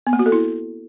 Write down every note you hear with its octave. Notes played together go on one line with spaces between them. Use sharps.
B3
A#3
F#4
A4
E4